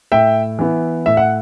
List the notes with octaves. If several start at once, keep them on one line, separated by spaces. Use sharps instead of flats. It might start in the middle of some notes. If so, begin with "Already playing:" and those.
A2 E5 G5
E3 B3
A2 E5
F#5